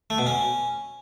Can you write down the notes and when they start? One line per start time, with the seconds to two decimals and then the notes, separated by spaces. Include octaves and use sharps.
0.10 A3
0.18 B2
0.26 C#4